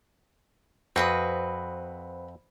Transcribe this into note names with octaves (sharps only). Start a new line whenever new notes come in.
F2 C4 F#4 B4 C5 B5 D#6